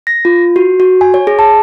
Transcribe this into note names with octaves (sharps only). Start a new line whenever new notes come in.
A#6
F4
F#4
F#4
G#5
C#5
G#4
A5